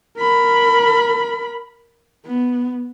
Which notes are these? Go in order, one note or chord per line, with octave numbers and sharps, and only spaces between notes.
A#4 B5
B3